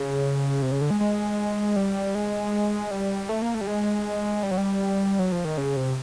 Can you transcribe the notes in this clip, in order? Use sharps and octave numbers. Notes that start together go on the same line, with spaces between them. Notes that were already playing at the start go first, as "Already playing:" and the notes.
Already playing: C#3
C3
C#3
D3
G#3
G#3
G3
G#3
G3
A3
A#3
A3
G3
G#3
G3
F#3
G3
F#3
F3
D#3
C#3
C3